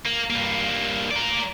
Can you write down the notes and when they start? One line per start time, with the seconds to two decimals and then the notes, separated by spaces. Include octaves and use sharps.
0.05 A#3
0.30 G2 A#3
1.11 A#4 D5